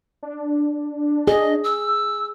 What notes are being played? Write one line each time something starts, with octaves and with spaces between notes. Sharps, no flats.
D4
G#4 D#5
E6